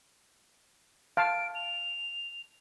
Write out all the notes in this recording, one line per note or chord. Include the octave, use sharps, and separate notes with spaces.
F5 A5 D7
F7